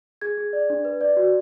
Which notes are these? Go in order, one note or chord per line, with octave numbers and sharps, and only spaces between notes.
G#4 G#6
G#4
D5
D4
B4
D5
F#4